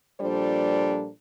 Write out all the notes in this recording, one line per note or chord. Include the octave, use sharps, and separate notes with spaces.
A#2 F3 G3 D4 A4 C5